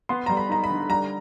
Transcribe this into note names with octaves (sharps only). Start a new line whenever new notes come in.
B3 C6
G3 A#5
B5
D#4 A#5
B5
D3
G3 A#5